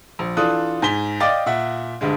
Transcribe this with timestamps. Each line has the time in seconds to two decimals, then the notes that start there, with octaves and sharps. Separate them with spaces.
0.19 A#1
0.37 E3 D4 F4 A4 D#6 F#6
0.82 G#2 G#5 B6 G7
1.20 D5 D#5 F5 G5 D6 A6
1.46 A#2 E5 F#5
2.01 D2 G2 G#3